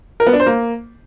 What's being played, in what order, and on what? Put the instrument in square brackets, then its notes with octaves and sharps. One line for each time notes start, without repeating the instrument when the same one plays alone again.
[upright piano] A#4
B3
D4
C5
A#3